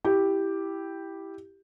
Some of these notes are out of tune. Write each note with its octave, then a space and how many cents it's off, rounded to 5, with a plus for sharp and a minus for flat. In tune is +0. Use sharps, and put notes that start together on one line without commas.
E4 +0 G4 +0